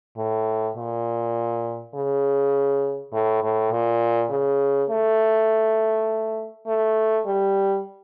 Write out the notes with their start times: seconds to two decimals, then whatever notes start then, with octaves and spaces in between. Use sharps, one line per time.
0.17 A2
0.76 A#2
1.94 C#3
3.13 A2
3.42 A2
3.72 A#2
4.30 C#3
4.89 A3
6.67 A3
7.25 G3